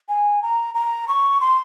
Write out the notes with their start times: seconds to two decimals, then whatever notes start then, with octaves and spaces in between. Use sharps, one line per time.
0.09 G#5
0.42 A#5
0.75 A#5
1.08 C#6
1.41 C6